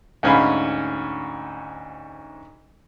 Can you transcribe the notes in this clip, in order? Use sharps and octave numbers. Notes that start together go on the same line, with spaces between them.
D2 G#2 C#4 F5 G#5 B5